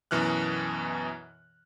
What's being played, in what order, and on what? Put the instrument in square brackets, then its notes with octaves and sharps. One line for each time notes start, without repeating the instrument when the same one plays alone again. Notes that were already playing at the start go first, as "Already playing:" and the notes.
[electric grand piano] F#2 B2 E3 F6 F#6